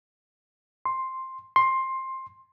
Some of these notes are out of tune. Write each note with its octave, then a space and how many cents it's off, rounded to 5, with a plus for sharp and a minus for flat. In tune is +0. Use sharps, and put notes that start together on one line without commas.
C6 +5
C6 +15